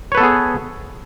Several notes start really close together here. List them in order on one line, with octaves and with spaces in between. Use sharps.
C#5 B4 A4 B3 G#4